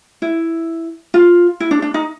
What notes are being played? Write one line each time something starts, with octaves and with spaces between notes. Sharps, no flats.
E4
F4
E4
D4
D4
D#4